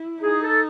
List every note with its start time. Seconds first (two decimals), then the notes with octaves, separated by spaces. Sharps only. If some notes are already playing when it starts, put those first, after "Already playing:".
Already playing: E4
0.22 D#4 G#4
0.42 A4